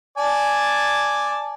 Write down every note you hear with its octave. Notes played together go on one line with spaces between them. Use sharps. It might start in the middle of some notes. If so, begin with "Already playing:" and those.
D5 G#5 A5